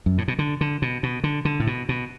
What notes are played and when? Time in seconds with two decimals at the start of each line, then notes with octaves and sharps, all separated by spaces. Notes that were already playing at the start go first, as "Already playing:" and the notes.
0.06 F#2
0.18 A2
0.28 B2
0.39 D3
0.61 D3
0.82 B2
1.03 B2
1.24 D3
1.45 D3
1.60 A2
1.67 B2
1.89 B2